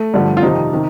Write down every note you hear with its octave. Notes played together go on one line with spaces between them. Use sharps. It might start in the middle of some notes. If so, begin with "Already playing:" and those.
Already playing: A3
G2 D3 F3
F4
F2 C3 D#3 C4 D#4
C3 D#3